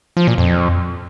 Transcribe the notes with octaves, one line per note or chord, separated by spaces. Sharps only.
F3
A#2
F2